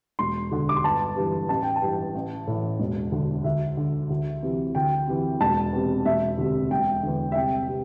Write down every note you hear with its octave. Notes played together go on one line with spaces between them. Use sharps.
E1 C6
D2 D3
D6
C6
G1 A5
G2 E3
A1 A5
G5
A5
G2 E3
A1
A2 E3
E1
D2 D3
D2 E5
D3
D2
C3 E3
D2 G5
C3 E3
E1 A5
E2 C3
E1 E5
D2 C3
E1 G5
E2 D3
E5
C2 G5
C3